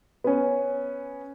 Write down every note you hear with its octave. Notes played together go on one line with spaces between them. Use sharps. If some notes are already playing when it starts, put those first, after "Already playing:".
B3 C#4